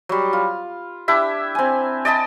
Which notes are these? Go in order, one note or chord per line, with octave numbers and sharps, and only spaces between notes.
F#3 G3
F4
D4 E4 G4 E5
C4 G#5
D5 D#5 A5 B5